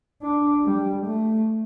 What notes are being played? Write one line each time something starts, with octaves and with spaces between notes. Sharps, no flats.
D4
G3
A3